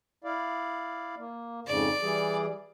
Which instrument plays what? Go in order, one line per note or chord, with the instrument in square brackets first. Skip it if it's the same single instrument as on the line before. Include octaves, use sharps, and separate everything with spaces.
[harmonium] E4 D5 F5
A#3
[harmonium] F2 G#2 C#3 [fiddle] D5
[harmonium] E3 G3 G#4